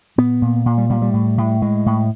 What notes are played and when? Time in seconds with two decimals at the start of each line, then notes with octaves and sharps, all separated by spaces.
0.18 A#2 B3
0.42 A#2
0.66 A#2
0.78 G3
0.90 A#2 G3
1.02 G3
1.14 A2
1.38 A2
1.62 A2 G#3
1.86 A2